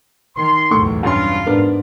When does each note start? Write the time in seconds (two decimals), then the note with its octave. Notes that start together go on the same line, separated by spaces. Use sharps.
0.37 D#3 C6
0.71 B1 E2 A2 C#6
1.03 G2 C#4 F4 C6
1.47 G#2 B3 D4 A#4